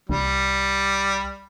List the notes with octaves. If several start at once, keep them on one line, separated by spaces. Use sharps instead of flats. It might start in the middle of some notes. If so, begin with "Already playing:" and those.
C2 G3